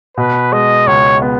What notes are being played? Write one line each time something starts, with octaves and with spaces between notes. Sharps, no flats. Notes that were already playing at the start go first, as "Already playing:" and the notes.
B2 B4
G#3 D#5
C#2 C#5
B3